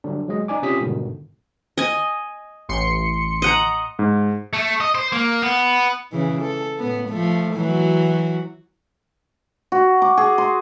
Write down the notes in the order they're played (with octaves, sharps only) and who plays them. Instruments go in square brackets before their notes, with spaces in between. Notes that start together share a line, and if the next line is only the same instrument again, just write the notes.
[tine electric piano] D3 F#3 G3 D4
F#3 G#3 D#5
D4 D#4 D5 G#5 D6
C3 C#4 F4 G4 D#6 B6
G#2 B2 D3 D#3 G3
[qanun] D#5 G#5
[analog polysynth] A1 C6 C#7
[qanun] D#5 F#5 A#5
[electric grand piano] G#2
[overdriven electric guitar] A3
D#5
C5
A#3
B3
[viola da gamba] C#3 E3
A4
A2 B3
F3 A3
E3 F#3 F#4
[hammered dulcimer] F#4
D6
G#4
C6